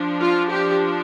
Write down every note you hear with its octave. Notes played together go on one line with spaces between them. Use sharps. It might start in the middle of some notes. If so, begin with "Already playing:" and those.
Already playing: F3 D4
F4
G4